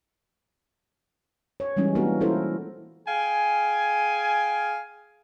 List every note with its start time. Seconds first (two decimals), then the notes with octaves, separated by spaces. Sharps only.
1.60 C#5
1.77 E3 G3 G#3 C#4 E4
1.95 A#3 B3 D4 F#4 A#4
2.21 C#4 E4 F4 A4 A#4 C5
3.06 G#4 F5 G5 G#5